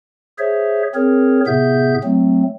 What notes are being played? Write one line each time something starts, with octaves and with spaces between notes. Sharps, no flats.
G#4 C5 C#5 E5
C4 G#4 A#4 C#5
A2 C3 B3 G#4 E5 G6
F#3 A3 C4